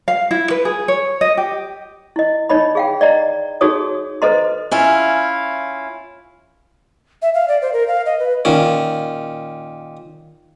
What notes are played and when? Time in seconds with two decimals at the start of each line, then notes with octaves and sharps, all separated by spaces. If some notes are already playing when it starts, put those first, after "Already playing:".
0.08 F5
0.31 E4
0.50 B4
0.65 G#4
0.88 C#5
1.21 D#5
1.37 G4
2.16 E4 D#5
2.49 D#4 C#5 D#5 B5
2.75 G#4 F5 G5
3.01 D5 D#5 A#5
3.61 D#4 F#4 G#4 A4 C#5 D#6
4.22 A4 B4 C5 D#5 A#5 C6
4.71 C#4 E4 F4
7.22 E5
7.34 F5
7.48 D5
7.62 C5
7.73 A#4
7.88 F5
8.06 D#5
8.19 B4
8.45 A#2 D#3 C#4